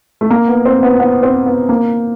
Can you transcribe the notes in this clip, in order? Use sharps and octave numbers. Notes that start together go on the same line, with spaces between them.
A3
A#3
B3
C4
B3
B3
C4
B3
A#3